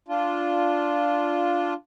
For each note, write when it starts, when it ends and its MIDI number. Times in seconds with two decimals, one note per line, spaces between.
0.08 1.74 62
0.08 1.74 65